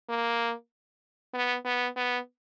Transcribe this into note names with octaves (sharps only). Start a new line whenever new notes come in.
A#3
B3
B3
B3